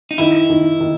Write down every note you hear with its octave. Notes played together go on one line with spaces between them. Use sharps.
D#4
D#3 E4
D#3
D#3